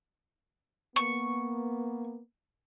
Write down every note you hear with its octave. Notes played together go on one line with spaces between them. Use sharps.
A#3 B3 C#6